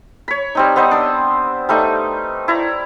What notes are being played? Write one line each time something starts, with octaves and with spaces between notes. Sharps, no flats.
C#5 B5
G3 C4 D#4
B3 C4 D#4 C5
D4 D#6 E6
G3 A3 D#4
E4 D5 A#5